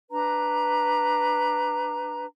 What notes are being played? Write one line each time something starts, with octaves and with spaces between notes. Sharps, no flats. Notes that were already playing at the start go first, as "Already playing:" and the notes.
D4 B4 A#5